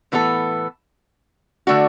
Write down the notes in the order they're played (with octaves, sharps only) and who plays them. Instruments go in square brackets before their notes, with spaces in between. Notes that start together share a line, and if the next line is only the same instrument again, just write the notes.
[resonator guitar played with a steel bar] A2 E3 B3 D4 A4
D3 A3 D4 F#4